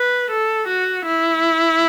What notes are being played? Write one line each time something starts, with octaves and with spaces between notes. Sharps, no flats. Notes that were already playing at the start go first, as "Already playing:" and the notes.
Already playing: B4
A4
F#4
E4